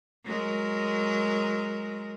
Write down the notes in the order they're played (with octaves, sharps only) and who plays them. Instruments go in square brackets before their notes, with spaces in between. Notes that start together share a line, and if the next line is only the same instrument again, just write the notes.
[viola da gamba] F#3 G#3 A#4